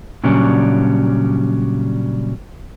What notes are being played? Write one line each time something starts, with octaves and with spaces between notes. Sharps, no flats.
A#2 C#3 F#3 G3 C#4 D4